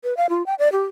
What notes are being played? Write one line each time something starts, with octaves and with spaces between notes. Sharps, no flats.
B4
F5
F4
G5
D5
G4